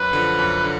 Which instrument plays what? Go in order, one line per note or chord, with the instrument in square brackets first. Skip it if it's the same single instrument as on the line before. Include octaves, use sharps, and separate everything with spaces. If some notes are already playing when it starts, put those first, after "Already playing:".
Already playing: [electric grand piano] F#2 [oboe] B4
[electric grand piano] D3 F3
F#2
D3